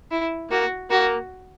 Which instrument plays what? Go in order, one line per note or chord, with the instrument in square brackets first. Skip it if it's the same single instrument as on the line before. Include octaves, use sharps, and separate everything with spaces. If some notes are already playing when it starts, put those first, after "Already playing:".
[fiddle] E4
[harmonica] A#3 [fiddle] F#4
[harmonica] A#3 [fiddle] F#4